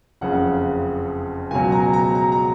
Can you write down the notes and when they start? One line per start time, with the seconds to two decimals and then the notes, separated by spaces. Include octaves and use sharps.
0.21 F#1 F2 C#3 F#5
1.51 C#2 B2 F#3 G#5
1.72 A#5
1.93 A#5
2.15 A#5
2.32 A#5